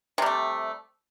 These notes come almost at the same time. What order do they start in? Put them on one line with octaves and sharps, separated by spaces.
C3 G3 A3